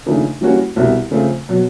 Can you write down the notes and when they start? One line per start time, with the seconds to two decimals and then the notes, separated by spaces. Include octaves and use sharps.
0.06 D#2 C#3 F3 A3 D4
0.41 E3 G3 A#3 C#4 F#4
0.76 C2 B2 G3
1.11 C#3 F3 A3 C4 F4
1.49 B2 F#3